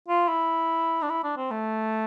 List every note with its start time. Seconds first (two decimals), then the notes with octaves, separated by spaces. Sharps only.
0.08 F4
0.28 E4
1.02 D4
1.10 E4
1.24 D4
1.37 C4
1.51 A3